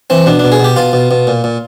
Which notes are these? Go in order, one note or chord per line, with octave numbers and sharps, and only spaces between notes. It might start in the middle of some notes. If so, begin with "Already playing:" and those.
E3 C4
B2 D4
B2 D4
G#4
B2 G4
B2 F4
B2
B2
A#2
A#2